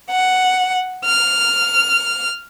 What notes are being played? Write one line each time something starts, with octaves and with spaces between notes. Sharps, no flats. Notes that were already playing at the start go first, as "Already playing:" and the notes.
F#5
F6